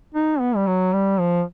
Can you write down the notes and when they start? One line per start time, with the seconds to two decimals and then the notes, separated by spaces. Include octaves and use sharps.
0.14 D#4
0.40 B3
0.56 G3
0.67 F#3
0.93 G3
1.20 F3